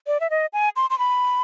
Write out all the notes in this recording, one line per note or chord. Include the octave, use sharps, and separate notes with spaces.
D5
E5
D#5
G#5
C6
C6
B5